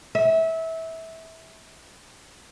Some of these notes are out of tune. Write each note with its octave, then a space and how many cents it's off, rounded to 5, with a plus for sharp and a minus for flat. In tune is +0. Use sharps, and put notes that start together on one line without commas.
E5 -20